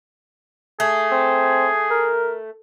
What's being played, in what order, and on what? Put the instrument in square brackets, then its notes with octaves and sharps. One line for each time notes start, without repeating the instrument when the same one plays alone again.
[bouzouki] A3 [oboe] G#4
[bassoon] C4
A#4